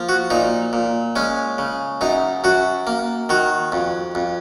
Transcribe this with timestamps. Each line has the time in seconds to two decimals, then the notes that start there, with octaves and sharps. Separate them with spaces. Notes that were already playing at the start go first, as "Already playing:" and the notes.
Already playing: F3 A#3
0.09 F#4
0.30 A#2 D#4
0.73 A#2
1.16 G#3 C#4
1.58 C#3
2.01 F#2 D#4
2.44 F#2 F#4
2.87 A#3
3.29 D#3 F#4
3.72 F2
4.15 F2